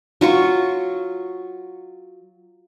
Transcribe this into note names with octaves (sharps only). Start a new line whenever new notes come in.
F#3 F4 C#6